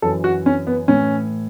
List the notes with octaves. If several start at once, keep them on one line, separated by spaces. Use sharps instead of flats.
F#2 E3 A4
F#4
C#4
B3
A2 E3 C#4